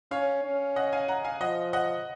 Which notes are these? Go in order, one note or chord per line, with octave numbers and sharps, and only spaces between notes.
C#4 C#5 F5
C#4
D#5 F#5
F5 G#5
F#5 A#5
F5 G#5
F3 D#5 F#5
D#5 F#5